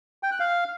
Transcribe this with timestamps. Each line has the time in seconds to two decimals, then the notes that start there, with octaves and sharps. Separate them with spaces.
0.23 G5
0.31 F#6
0.40 F5